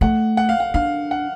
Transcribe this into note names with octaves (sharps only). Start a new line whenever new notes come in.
A3 F#5
F#5
F5
F#5
D4 F5
F#5